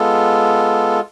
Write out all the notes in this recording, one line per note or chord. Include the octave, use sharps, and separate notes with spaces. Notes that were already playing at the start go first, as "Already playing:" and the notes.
Already playing: G#3 B3 F4 A4